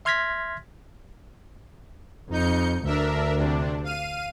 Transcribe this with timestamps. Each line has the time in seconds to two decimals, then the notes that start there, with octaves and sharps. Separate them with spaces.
0.05 E5 C6 F6 G#6 A#6 B6
2.31 F2 D#4 G6 C#7
2.85 D2 D4 A#4 E5
3.36 C3 D4
3.84 F5 D#7